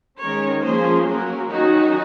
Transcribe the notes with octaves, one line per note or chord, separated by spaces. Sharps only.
D#3 G#3 C#4 A#4 C#5
F3 A#3 C#4 G#4 C5
F#3 A#3 C#4 F#4 A#4
D#3 F#3 C#4 D#4 F#4